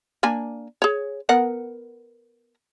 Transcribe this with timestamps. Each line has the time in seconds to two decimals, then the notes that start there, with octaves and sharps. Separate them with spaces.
0.23 A#3 D4 G#5
0.82 G#4 C#5
1.29 B3 A#4 F#5